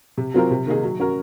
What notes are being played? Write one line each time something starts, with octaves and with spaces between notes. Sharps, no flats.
C3
F#3 C4 F4 A#4
C3
D#3 A#3 D#4 G#4
F#3
C#4 F#4 A#4